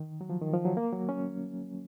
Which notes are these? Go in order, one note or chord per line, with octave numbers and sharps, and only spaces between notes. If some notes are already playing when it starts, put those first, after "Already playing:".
Already playing: D#3
F#3
F3
D#3
F3
F#3
A#3
F#3
C#4